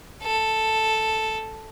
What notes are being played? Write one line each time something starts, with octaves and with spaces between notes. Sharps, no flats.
A4